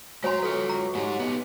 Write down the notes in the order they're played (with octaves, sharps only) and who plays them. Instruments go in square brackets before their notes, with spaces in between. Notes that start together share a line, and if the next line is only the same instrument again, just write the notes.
[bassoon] F#3 [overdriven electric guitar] G#3 A#5 [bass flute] F#4 [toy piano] C#5 G#5 C6
[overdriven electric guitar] F4 B4 [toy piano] A4
[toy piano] A#5
[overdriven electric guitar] G#2 D#4 [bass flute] G4
[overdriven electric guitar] B3 D#4